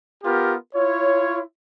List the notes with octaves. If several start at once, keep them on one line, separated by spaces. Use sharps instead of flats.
B3 F4 G4 A#4
E4 F4 C#5